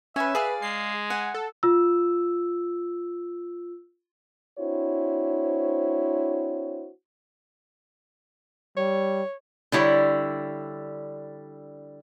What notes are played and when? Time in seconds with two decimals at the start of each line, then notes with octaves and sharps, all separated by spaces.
0.16 C#4 B4 E5 G#5
0.35 G#4 B4 D5 F5
0.62 G#3 C7
1.10 F#5 G#5
1.34 A4
1.63 F4 E6
4.59 C4 D4 E4 F#4 C5 C#5
8.77 G3 C#5
9.72 D3 G3 E4 C#5